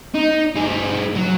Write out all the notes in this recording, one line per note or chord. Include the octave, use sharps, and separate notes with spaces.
D#4
G2 G#4
F#3